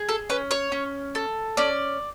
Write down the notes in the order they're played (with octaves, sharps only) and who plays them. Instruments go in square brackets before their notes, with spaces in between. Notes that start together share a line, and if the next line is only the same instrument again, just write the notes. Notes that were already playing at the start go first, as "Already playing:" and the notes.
Already playing: [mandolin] G#4
A4
C#4 B4
C#5
C#4
A4
C#4 D5